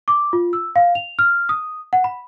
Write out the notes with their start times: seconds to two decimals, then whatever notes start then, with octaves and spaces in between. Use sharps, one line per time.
0.08 D6
0.33 F4
0.53 E6
0.76 F5
0.95 F7
1.19 F6
1.49 D#6
1.93 F#5
2.04 B5